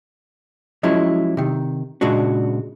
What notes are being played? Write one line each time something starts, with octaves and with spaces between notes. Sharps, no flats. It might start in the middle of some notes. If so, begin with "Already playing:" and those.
F3 F#3 G#3 C#4 E4
C3 D#3
A#2 C#3 G#3 D4 F#4